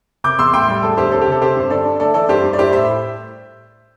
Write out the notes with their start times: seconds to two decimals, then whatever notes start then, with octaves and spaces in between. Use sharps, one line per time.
0.24 C3 D6 G6
0.39 E2 C6 E6
0.53 A2 G5 C6
0.68 G3
0.83 E1 A4
0.97 D2 G4 C5
1.12 C4 A4
1.21 G4
1.27 C3 A4
1.41 C4 G4 C5
1.56 G2 C5
1.70 D3 A4 D5
1.85 D3
2.00 A3 A4 D5
2.14 E3 A4 D5
2.28 G2 G4 C5
2.43 G2
2.53 D5
2.58 E4 G4 C5
2.72 A2 C5 E5